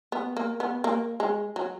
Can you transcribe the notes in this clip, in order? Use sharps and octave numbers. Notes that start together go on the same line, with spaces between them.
B3
A#3
B3
A#3
G#3
F#3